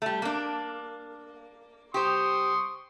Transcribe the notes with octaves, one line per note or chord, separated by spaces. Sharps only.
G3 A3
A#3 D4
G4 C5 C6 C#6 D#6